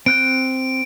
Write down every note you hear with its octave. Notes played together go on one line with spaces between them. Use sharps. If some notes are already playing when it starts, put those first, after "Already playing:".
C4 F#6 G6 D7